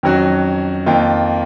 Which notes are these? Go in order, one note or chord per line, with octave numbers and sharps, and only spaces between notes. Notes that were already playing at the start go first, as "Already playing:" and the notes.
F2 D#3 F#3 C#4 F#4
F2 D#3 A#3 F4